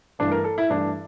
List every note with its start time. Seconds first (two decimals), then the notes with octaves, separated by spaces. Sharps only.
0.19 G2 E3 A3 D4
0.32 A#4
0.44 A4
0.58 E4
0.69 G2 E3 A3 D4